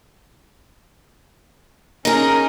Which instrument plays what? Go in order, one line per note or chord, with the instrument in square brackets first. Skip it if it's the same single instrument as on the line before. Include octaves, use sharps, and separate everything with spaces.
[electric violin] C#4 A#4 [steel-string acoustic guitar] D#4 G#4